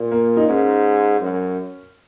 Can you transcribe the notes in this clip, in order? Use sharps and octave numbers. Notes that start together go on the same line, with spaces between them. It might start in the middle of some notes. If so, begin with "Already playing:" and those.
Already playing: A#2
A#3
D#4
G#2 C#4
F#2